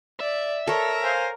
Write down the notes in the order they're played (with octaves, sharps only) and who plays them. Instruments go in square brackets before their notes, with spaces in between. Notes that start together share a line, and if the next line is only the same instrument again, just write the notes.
[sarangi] D5 [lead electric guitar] E5
[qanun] A4 C#5 [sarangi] A#4
[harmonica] C5 F5 G#5